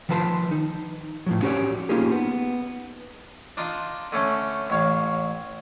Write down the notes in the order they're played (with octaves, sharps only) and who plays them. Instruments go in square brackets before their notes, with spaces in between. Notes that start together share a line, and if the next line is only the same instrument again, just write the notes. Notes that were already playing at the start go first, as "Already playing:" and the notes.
[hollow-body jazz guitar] D#3 F3 B4 E5 A5 C6
D#4
A2 F3 F#3
C#4 F#4 G4 A#4 C#5 D5
A#3 C#4 D#4 F4 G4 G#4
B3
[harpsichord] D4 D#4 F4
D3 A3 C#4
A1 C#5 F5